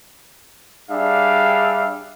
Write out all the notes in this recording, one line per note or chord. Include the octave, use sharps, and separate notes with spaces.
G3 D4 G#4 E5 F5